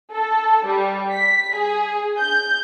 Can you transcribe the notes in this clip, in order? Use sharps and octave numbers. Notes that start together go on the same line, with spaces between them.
A4
G3
B6
G#4
G6